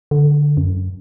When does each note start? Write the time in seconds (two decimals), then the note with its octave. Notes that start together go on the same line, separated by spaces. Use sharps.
0.11 D3
0.57 F#2